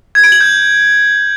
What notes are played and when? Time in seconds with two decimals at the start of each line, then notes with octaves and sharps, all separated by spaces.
0.15 G#6
0.24 D7
0.32 F#7
0.41 G6